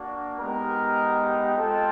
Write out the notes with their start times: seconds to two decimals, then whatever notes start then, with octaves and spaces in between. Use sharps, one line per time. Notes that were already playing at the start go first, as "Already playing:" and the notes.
Already playing: A#3 D4 F#4
0.40 G#3 B3 D#4 G4 A#4
1.56 G#3 C4 F4 A4